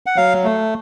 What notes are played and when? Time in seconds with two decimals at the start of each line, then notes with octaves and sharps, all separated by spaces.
0.06 F#5
0.16 F#3 F5
0.44 A3